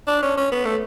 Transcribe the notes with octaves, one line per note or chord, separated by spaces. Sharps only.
D4
C#4
C#4
B3
A3